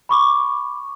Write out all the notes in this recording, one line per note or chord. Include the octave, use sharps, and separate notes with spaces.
B5 C#6 D6